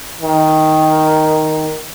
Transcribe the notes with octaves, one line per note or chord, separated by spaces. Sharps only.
D#3